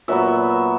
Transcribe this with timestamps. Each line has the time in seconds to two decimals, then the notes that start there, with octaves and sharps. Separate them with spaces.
0.08 A#2 F#3 B3 E5